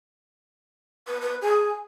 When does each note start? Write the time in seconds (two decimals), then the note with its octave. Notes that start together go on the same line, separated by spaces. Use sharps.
1.07 B4
1.21 B4
1.42 G#4